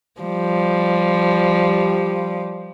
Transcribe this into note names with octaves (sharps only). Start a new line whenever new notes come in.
F3 G3